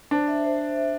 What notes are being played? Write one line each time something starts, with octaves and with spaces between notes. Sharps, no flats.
D4 C5
E5
C5
C5
E5